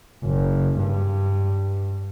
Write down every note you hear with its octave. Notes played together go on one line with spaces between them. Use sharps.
F#1
G2